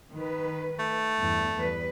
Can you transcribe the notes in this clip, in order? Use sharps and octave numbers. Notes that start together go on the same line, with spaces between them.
D#3 B4
A3
E2 G2
E2 G3 B4